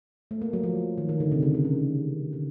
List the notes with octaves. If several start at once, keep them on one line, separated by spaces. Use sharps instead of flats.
A3
A#3
F#3
F3
D#3
D#3
D3
C3
C#3
C#3
D#3
D3